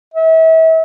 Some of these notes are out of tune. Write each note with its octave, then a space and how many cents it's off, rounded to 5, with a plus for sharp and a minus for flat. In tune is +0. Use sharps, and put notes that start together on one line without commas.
E5 -35